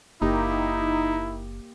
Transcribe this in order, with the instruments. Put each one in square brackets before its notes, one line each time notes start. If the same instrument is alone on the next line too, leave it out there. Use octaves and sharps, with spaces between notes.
[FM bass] F#1 [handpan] A#3 G4 [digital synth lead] D#4 [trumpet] E4